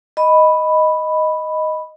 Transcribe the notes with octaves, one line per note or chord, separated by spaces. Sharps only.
D#5 B5